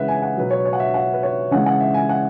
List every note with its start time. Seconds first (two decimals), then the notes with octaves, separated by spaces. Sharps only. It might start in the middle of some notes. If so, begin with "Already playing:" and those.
Already playing: C#3 E3 G#3 B4 E5 F#5
0.08 G#5
0.22 F#5
0.37 B2 F#3 B4
0.51 C#5
0.66 C#5
0.73 F#5
0.80 E5
0.94 F#5
1.14 B4
1.23 C#5
1.51 C#3 E3 G#3 F#5
1.66 F#5
1.80 E5
1.94 G#5
2.09 F#5